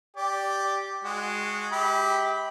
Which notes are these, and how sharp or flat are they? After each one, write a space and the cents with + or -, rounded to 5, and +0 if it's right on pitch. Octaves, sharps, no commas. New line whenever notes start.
G4 +0 D5 +0
G#3 +0 F#4 -20
G4 +0 E5 -45 B5 +0